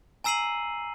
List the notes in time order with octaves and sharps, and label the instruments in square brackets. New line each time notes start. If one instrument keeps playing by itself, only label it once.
[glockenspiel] G#5 A#5 E6 C7 D#7 F#7